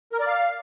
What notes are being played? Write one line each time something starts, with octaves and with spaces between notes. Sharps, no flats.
A#4
D5
F5